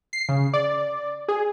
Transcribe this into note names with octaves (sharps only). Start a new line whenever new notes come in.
C7
C#3
D5
G#4